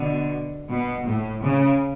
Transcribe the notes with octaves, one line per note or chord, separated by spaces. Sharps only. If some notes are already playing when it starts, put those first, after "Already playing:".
Already playing: B2 D3
B2
A2
C#3